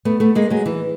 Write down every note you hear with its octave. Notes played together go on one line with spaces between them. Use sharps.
A3 B3
A3 B3
G#3 A#3
F#3 G#3
E3